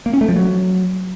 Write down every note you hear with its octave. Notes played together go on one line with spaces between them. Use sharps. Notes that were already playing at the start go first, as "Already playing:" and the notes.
A#3
C#4
A3
F3
F#3